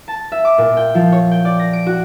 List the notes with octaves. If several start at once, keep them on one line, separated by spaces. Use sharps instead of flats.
A5
E5
D6
A#2
G5
F3
C#5
G5
D5
A#6
D7
F#4